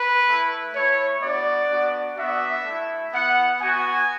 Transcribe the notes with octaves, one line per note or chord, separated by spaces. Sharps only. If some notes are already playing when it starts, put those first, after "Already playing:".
Already playing: B4
A3 E4
A3 E4 C#5
B3 D4 F#4 D5
B3 D4 F#4
B3 D4 F#4 E5
A3 E4
B3 E4 F#5
B3 F#4 G#5